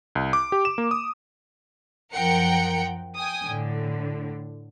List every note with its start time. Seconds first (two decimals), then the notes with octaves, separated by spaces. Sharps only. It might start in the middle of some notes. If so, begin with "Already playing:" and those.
0.15 C2
0.33 D6
0.52 G4
0.65 E7
0.78 A#3
0.91 D#6
2.13 F#2 F3 A#4 F#5 G5 C#7
3.16 G5 G#5 D#6
3.46 A2 D3